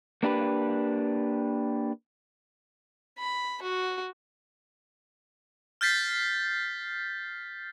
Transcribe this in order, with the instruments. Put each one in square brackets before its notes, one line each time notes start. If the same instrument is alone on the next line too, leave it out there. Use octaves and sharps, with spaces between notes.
[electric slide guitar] A#3 D4 G4 B4
[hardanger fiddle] B5
F#4
[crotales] F6 G6 A6 B6 C7